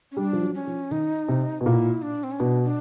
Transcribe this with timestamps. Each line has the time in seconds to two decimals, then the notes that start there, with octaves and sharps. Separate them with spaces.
0.12 C#4
0.17 G3 D4
0.33 F3
0.42 F#3
0.55 C#4
0.67 F3
0.91 D#3 D#4
1.28 C3
1.61 B2
1.66 A#2 E4
2.02 D4
2.24 C4
2.32 C#4
2.40 B2 D4
2.64 D4